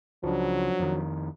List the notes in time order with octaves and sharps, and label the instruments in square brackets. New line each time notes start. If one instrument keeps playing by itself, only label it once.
[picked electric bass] C#2 C#3 [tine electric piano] F3 D4 [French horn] F#3
[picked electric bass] F2 D#3